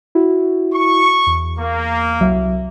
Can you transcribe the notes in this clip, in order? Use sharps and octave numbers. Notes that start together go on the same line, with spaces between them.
E4 F#4
C#6
E2
A#3
C2 F#3 E5